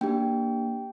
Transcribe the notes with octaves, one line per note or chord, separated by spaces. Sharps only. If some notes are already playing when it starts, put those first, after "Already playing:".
A#3 D4 G4 G5